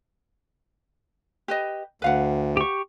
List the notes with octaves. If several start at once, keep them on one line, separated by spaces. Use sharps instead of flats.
G4 B4 D#5
D2 B4 F5 F#5
G4 C#6